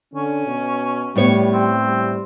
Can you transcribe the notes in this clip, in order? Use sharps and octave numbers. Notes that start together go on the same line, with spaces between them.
D3 C#4
B2
A2 G3 B3 C#5
C4
G3